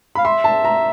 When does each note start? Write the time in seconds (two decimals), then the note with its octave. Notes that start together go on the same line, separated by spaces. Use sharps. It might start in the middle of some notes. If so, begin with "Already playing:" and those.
0.15 F5 B5
0.25 E5 C6
0.44 A5
0.65 A#5